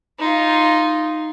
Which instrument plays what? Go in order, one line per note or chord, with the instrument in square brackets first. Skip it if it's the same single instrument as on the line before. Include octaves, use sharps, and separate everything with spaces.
[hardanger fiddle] D#4 F4